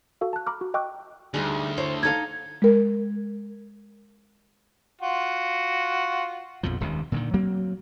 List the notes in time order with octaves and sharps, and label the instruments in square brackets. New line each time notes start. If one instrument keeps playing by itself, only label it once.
[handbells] F#4 A4 F5
A5 F#6
A#5 B5 D6 F6
F#4
D#5 G5 C#6 D6 E6 F#6
[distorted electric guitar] D2 [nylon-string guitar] G3 D#4 G#4
[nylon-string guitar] E4 C5 C#5
[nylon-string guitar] D#4 A4 F5 [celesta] G#6
[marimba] G#3 A#4
[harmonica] F4 F#4
[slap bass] A#1 F2 B2 F3
D#1 C#2 C3 D#3
A#2 D3 D#3
F#3 A#3 C4